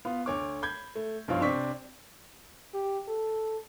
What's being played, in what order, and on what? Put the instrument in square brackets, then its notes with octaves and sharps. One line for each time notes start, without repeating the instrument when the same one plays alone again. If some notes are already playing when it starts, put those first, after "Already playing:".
[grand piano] B3 F4
D2 C#5 D6
B5 G6 G#6
A3
B1 G2 F3 F4 C#5
C3 C4 D4 D5 C#6 B6
[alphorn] G4
A4